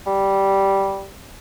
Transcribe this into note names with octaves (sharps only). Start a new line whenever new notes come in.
G3